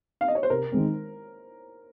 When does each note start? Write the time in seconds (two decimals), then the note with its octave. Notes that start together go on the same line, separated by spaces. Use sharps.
0.21 F5
0.28 D#5
0.35 C#5
0.43 C5
0.50 C3 A#4
0.72 D#3 G#3 C4